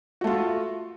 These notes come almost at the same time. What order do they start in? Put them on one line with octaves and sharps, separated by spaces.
F#4 A3 F4